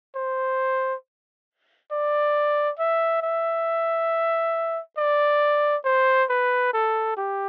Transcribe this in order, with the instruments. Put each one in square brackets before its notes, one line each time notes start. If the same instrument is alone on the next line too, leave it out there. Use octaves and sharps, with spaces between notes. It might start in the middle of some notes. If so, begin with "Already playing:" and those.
[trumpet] C5
D5
E5
E5
D5
C5
B4
A4
G4